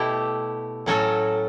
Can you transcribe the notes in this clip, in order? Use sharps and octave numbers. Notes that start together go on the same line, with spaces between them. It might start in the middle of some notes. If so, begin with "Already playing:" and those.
Already playing: B2 A3 E4 G4
A2 F#3 C#4 F#4 A4